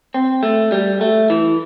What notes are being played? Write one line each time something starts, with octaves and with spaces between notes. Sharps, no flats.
C4
A3
G3
A3
E3